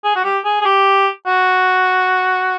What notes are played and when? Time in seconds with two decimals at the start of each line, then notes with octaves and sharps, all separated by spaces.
0.04 G#4
0.16 F#4
0.24 G4
0.45 G#4
0.61 G#4
0.65 G4
1.26 F#4